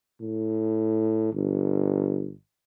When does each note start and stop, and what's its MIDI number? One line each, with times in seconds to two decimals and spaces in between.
0.22 1.31 45
1.34 2.33 31